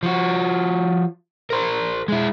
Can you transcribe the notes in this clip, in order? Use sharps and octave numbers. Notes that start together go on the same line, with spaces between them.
F3 F#4
A#4 C5
G#3 E4